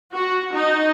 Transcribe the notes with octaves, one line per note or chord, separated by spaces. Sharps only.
F#4
D#4